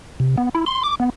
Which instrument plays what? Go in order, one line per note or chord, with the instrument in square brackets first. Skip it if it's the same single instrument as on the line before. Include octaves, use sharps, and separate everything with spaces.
[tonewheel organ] C3
B3
E4
C6
D6
B3